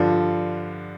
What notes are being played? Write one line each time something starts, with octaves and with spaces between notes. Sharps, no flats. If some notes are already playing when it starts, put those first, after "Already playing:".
Already playing: G2 D3 F3